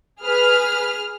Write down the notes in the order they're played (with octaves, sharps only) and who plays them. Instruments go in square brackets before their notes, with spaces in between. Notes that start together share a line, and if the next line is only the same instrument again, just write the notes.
[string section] G#4 F6 [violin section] B4